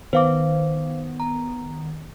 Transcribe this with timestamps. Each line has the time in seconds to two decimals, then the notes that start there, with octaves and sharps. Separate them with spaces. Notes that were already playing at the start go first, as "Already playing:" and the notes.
0.13 D#3 B3 C5 F5 D6
1.20 A#5